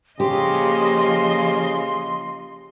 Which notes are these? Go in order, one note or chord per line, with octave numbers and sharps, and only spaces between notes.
C#3 F3 A#3 G4 D#5 C6